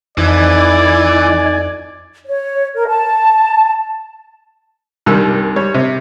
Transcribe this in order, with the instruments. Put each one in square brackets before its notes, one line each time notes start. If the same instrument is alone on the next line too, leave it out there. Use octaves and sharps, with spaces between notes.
[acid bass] F2 [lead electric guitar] E3 [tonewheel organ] D#4 G#5 [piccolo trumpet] D5
[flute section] C#5
A#4
A5
[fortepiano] C2 G2 D#3 G3 E6
G3 C#5
C3